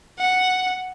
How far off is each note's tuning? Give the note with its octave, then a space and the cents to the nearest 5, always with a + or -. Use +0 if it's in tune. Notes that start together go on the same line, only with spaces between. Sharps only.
F#5 +0